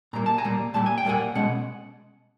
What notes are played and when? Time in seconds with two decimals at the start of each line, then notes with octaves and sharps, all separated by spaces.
0.13 A#2 G3 A#3 A#5
0.26 A5
0.38 G#5 A#5
0.44 A#2 G3 A#3
0.74 A#2 G3 A#3 A5
0.86 G#5
0.98 G5
1.05 A#2 G3 A#3 F#5 G#5
1.35 B2 G#3 C#4 F#5